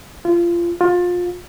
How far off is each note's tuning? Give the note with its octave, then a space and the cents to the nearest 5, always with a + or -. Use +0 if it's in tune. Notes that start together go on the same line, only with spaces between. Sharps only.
F4 -25
F4 +25